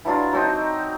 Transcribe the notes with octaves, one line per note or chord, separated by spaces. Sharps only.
E3 F#3 D4 F4
F#3 C4 D#4